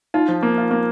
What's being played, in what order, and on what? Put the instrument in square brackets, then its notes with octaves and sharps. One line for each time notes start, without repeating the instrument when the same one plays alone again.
[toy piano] D#4 [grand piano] F4
[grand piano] F3
A#3
F4
A#3